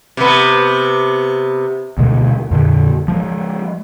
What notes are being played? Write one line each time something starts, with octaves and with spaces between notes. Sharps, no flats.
C3 B3
D2 B2 G#3
F2 A#2 D3
F3 G#3